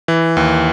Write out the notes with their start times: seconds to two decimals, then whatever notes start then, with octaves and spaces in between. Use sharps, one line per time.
0.08 E3
0.37 D#2